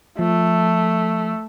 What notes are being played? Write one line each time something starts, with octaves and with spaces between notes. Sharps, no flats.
F3 A3